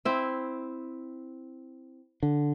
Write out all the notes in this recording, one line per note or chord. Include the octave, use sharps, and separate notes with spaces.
C4 E4
D3